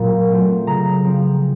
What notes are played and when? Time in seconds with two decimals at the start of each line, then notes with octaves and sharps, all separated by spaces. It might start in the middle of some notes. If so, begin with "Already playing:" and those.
Already playing: A#2 F#3 C4
0.31 F#3 A3 C4
0.67 C#3 A#5
1.04 F3 C4